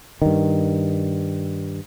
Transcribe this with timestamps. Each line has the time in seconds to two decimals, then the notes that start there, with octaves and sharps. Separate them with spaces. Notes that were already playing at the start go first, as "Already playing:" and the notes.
0.22 G2 D#3